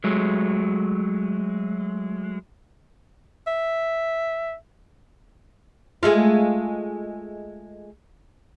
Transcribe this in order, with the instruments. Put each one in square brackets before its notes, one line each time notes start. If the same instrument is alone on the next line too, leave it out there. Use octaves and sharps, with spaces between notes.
[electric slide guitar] F#3 G#3 A3
[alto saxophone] E5
[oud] G#3 A3 F4